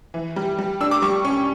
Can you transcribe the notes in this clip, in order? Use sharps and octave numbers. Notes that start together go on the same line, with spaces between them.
E3
G3
G3
D4 E6
D6
G3 C#6
C#4 C#6